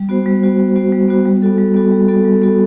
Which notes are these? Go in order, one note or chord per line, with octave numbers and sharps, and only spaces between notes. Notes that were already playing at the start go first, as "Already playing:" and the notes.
Already playing: G3
B3 F#4 C5
G3
B3 F#4 C5
G3
B3 F#4 C5
G3
B3 F#4 C5
G3
B3 F#4 A4
G3
B3 F#4 A4
G3
B3 F#4 A4
G3
B3 F#4 A4